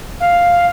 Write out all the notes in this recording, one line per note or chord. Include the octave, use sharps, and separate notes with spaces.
F5